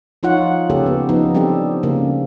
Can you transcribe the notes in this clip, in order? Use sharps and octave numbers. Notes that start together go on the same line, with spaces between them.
F3 D#4 F4 C#5 F#5
C#3 A#3 C#4 G4 A4
B3
F3 B3 D#4
G3 C4 D4 G4 A4
C#3 A#3